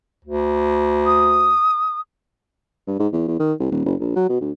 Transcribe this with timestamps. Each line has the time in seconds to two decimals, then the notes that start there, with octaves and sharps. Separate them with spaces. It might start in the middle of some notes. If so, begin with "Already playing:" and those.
0.25 D2
1.06 D#6
2.87 G2
2.99 G#2
3.13 E2
3.28 E2
3.39 D#3
3.60 C2
3.71 D#1
3.86 F#1
4.00 A#1
4.16 F#3
4.29 B2
4.41 D2